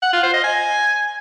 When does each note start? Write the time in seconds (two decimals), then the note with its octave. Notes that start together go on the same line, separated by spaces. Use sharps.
0.03 F#5
0.13 F4
0.23 C5
0.34 D#5
0.44 G#5